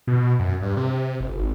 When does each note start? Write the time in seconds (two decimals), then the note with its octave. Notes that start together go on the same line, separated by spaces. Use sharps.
0.07 B2
0.39 F#2
0.62 G2
0.77 C3
1.20 F#1
1.37 G#1